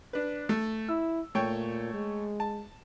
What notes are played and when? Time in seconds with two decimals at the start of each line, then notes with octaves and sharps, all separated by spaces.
0.13 D4 B4
0.49 A3
0.89 E4 E6
1.35 A#2 A3 C#5 G5
1.94 G#3
2.40 A5